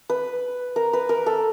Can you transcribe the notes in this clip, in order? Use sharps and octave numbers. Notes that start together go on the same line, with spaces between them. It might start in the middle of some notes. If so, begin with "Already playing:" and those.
B4
A#4
B4
A#4
A4